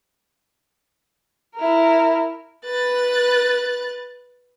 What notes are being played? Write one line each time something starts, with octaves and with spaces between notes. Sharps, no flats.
E4 A#4
B4 F#6 A6